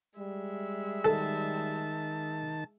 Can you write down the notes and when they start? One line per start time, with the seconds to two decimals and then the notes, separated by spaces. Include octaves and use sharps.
0.18 G3 G#3 E5
1.05 D#3 A4 A5